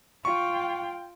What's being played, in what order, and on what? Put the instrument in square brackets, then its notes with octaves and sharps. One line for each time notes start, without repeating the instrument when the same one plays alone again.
[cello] F4 G5 [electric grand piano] C#6